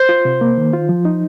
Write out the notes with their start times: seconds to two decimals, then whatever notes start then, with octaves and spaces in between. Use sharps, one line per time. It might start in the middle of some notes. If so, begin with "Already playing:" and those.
Already playing: C5
0.09 F4
0.25 C3
0.41 A#3
0.57 D#3
0.73 F4
0.89 F3
1.05 D#4